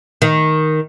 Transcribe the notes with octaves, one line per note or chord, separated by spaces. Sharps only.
D#3